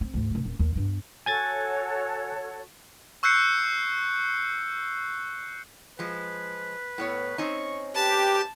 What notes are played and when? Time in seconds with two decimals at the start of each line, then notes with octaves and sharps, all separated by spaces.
0.01 C4
0.14 D2 G#2
0.30 C2 A3
0.45 D#1
0.59 D#2
0.76 G2 B3
1.26 F#4 A4 C#5 G#5 G#6 A6
3.23 C#6 E6 F#6 G6 C7 C#7
5.99 F3 G#3 B4
6.98 A2 B3 C#5
7.38 C4 C#4 D#4 C#6
7.95 G4 B4 A5